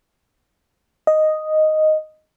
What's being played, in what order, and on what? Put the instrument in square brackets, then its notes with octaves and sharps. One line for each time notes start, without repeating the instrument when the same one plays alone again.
[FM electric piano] D#5